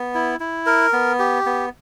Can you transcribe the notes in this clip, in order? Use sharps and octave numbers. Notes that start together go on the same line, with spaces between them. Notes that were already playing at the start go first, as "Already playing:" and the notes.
Already playing: B3
E4
E4
A#4
B3
G4
B3